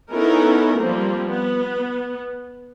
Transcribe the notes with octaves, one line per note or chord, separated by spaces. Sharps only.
B3 C#4 D#4 E4 A4 A#4
F3 G3 A#3 C4
B3